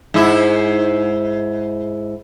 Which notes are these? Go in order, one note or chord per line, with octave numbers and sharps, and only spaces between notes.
G#2 E4